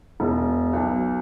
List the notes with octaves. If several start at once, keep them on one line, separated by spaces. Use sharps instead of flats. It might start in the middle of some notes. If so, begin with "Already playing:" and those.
E1
B1